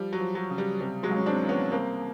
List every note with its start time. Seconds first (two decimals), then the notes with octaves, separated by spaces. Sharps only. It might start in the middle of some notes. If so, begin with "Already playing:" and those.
Already playing: F3 G3
0.13 F#3
0.20 F3
0.35 F#3
0.50 C#3
0.58 G3
0.81 C3 G3
1.03 F#3 G#3
1.11 C#2
1.16 C#4
1.26 C4 D4
1.41 E3
1.49 B3 C#4
1.72 C2 A#3 C4